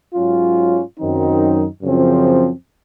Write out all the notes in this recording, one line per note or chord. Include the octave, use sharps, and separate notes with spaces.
G#2 F#3 C#4 F4
F#2 D#3 F#3 C4 D#4
F#2 C#3 F3 C4